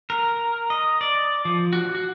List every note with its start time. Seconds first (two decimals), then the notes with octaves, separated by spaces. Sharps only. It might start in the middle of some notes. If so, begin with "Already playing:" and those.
0.10 A#4
0.70 D#5
1.01 D5
1.45 F3
1.73 F#4
1.95 F#4